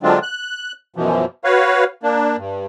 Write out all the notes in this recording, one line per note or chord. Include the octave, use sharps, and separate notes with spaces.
D3 F#3 G#3 C4 D4 F4
F#6
F#2 B2 E3 F3
F#4 B4 C#5 F5
A#3 D4
G2